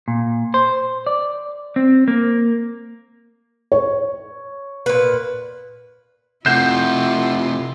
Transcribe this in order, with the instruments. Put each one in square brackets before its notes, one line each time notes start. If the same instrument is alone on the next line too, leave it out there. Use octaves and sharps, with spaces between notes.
[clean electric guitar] A#2
C5
D5
C4
A#3
[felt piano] C#5
[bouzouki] A#2 B4
[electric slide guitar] C3 A3 [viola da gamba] E4 F4 [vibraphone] F#5 [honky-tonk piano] G6 C7 E7